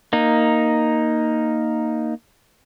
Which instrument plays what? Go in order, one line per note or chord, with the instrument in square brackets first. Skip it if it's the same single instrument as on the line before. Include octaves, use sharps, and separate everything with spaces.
[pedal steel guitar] A#3 D#4